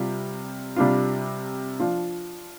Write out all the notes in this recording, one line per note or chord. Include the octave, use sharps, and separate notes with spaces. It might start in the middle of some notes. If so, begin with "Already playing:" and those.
Already playing: C3 G3 F4
C3 G3 D4 F4
F3 D4 F4